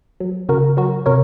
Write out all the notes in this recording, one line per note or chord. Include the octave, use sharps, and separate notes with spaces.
F#3
C#3 F#4 A#4
F#3 F#4 A#4
C3 A#4 C#5